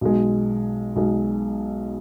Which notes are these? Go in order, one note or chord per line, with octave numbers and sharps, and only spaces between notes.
B1 B2 G#3
B1 B2 G#3